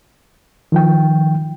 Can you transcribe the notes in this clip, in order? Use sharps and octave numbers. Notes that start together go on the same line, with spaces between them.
D#3 F3 G5